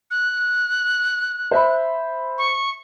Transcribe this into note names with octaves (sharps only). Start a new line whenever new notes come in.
F#6
C5 E5 B5
C#6